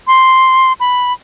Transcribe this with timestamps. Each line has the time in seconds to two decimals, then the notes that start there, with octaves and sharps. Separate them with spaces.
0.07 C6
0.80 B5